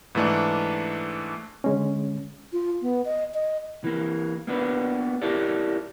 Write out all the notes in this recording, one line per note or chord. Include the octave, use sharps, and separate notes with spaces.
G#2 E3 A3 D4
D3 G#3 C#4
F4
B3
D#5
D#5
E3 A#3
A#3 B3 D4 B4
E4 G4 A4 A#4 D5